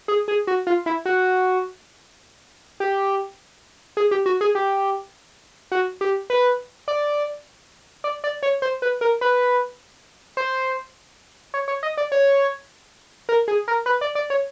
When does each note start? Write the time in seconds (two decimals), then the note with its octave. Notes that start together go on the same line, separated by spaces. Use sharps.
0.08 G#4
0.28 G#4
0.47 F#4
0.67 F4
0.86 E4
1.05 F#4
2.80 G4
3.97 G#4
4.11 G4
4.26 F#4
4.41 G#4
4.55 G4
5.72 F#4
6.01 G4
6.30 B4
6.88 D5
8.04 D5
8.24 D5
8.43 C#5
8.62 C5
8.82 B4
9.01 A#4
9.21 B4
10.37 C5
11.54 C#5
11.68 C#5
11.83 D#5
11.97 D5
12.12 C#5
13.29 A#4
13.48 G#4
13.68 A#4
13.86 B4
14.01 D5
14.15 D5
14.30 C#5